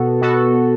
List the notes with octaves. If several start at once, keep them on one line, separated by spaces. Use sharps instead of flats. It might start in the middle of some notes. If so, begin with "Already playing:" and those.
Already playing: B2 B3 F#4 A4
B2 B3 F#4 A4